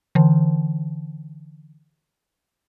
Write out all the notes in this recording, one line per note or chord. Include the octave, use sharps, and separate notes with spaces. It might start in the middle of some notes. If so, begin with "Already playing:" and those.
D3 E3